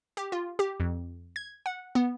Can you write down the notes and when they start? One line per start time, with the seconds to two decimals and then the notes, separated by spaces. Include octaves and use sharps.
0.17 G4
0.32 F4
0.59 G4
0.80 F2
1.36 G#6
1.66 F#5
1.95 B3